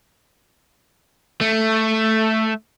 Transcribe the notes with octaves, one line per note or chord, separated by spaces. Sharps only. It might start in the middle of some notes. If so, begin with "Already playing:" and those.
A3